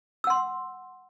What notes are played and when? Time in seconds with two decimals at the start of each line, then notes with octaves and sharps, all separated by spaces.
0.24 E6
0.27 F#5
0.30 C6